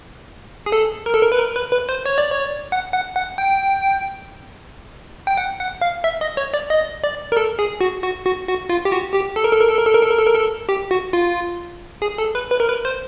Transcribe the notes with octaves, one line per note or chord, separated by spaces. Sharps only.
G#4
A4
A#4
A4
A#4
B4
A#4
B4
B4
C5
C#5
D5
C#5
F#5
F#5
F#5
G5
G5
F#5
F#5
F5
E5
D#5
C#5
D5
D#5
D5
A#4
A4
G#4
F#4
F#4
F#4
F#4
F4
G4
F#4
G4
A4
A#4
A4
A#4
A4
A#4
A4
A#4
A4
A#4
A4
A#4
A4
G4
F#4
F4
G#4
A4
B4
B4
A#4
B4
C5